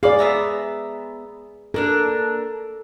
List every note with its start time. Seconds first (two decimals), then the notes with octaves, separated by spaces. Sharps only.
0.03 G#4 D5 F5 B5 D6
0.19 B3 E5 A#5
1.74 A#3 D4 A4 A#4